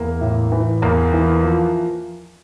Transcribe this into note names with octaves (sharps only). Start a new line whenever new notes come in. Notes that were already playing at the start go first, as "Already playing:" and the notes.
Already playing: E2 A#3
A2
E3
E2 A#3
E3
F3